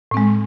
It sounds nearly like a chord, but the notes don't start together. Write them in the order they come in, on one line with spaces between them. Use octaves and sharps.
A2 C4 G#3